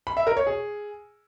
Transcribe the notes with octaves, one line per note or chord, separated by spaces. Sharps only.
B5
E5
A#4
C#5
G#4